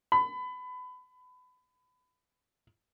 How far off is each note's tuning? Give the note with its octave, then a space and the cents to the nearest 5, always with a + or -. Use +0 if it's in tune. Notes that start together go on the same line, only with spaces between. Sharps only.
B5 +25